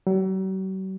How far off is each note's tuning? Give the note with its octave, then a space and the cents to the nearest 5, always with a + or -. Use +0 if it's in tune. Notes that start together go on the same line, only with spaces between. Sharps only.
F#3 +45